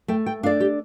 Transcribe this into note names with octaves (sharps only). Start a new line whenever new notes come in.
A3 G5
G5
D4 A4 D5 F5
G4